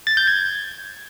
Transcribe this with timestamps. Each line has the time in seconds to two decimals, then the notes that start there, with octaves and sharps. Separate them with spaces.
0.07 A6
0.17 G6
0.27 G#6